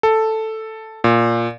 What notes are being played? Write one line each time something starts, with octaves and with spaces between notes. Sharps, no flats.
A4
A#2